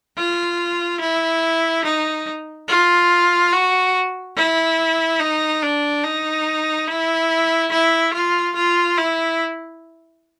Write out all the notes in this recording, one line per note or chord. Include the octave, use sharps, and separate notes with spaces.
F4
E4
D#4
F4
F#4
E4
D#4
D4
D#4
E4
E4
F4
F4
E4